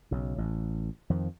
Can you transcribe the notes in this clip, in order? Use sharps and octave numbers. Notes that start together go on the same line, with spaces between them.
B1 C#3
A1
F2 D#3 F3